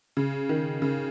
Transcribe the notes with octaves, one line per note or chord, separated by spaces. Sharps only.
C#3
D#3
C#3